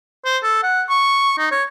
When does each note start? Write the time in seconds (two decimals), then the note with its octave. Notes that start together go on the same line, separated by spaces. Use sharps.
0.25 C5
0.43 A4
0.63 F#5
0.89 C#6
1.38 D#4
1.51 C#5